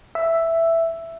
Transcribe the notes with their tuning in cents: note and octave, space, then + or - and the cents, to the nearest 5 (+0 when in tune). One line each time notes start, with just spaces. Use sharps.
E5 +5